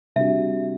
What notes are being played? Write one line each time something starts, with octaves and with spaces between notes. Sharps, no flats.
C3 G3 D4 F#4 E5